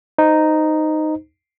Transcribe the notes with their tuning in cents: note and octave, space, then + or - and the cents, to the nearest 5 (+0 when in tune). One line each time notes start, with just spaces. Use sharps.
D#4 -5 C5 -10